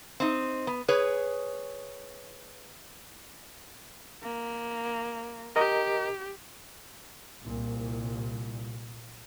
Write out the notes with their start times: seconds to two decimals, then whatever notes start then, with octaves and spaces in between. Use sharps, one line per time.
0.20 C4 D#4
0.67 B3
0.88 G#4 B4 C#5
4.23 A#3
5.56 G4 A#4 D#5 A#5
7.43 C2 A#2